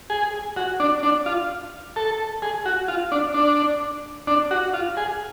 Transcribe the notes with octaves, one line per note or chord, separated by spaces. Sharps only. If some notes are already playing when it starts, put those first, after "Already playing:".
G#4
F#4
D4
D4
F4
A4
G#4
F#4
F4
D4
D4
D4
F#4
F4
G#4